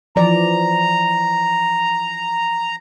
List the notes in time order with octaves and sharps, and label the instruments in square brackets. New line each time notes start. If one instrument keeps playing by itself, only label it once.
[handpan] E3 F3 D5 [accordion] A#5